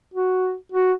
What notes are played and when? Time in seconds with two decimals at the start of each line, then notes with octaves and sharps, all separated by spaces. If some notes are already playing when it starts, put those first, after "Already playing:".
0.14 F#4
0.72 F#4